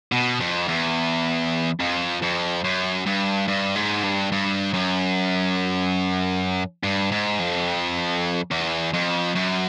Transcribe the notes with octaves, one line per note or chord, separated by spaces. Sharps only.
B2
F2
E2
F2
F2
F#2
G2
G2
G#2
G2
G2
F#2
G2
G#2
F2
E2
F2
F#2